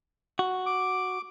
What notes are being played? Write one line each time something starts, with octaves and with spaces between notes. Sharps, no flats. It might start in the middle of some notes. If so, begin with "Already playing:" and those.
F#4
D6